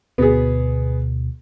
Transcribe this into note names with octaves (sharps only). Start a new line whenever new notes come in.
D2 B2 B3 G#4